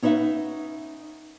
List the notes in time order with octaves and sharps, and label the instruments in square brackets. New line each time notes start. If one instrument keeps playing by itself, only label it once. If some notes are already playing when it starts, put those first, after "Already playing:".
[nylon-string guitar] C#4 D#4 B4 D#5 E5 F#5